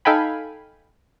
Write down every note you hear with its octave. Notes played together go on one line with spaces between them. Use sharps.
D#4 A4 F5 G5 G#5 B5